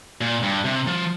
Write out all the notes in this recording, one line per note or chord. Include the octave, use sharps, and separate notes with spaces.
A#2
G2
C3
F3